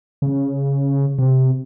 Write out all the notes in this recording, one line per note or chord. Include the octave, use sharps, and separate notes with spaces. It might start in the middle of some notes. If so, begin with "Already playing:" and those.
C#3
C3